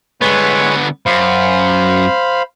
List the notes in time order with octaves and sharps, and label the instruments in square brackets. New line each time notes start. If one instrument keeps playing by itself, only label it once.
[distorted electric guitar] D3 B3 [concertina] G#3 B4 C#5
[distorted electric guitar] F#2 [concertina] C5 F5 B5